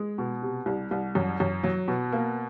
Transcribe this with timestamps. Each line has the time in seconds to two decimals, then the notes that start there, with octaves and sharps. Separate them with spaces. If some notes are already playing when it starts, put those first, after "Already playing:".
Already playing: G#3
0.18 B2
0.42 C3
0.66 C2
0.91 C2
1.15 F#2
1.40 F#2
1.63 F#3
1.88 B2
2.12 A#3